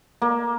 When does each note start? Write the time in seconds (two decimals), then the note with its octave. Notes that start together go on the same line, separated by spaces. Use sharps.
0.22 A#3